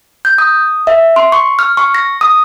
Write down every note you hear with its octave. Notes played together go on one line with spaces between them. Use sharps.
G6
D#6
E5
C6
C#6
F6
C#6
A#6
D#6